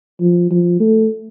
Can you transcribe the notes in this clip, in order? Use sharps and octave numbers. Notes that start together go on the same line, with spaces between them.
F3
F3
A3